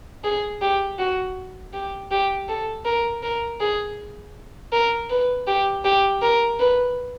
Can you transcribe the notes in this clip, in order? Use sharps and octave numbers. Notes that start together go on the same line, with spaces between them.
G#4
G4
F#4
G4
G4
A4
A#4
A#4
G#4
A#4
B4
G4
G4
A#4
B4